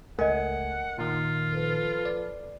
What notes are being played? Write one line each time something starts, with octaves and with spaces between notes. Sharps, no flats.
C#2 A3 A#4 D#5 F#5 G#5
A#2 D#3 F4
F3 A4 B4
D5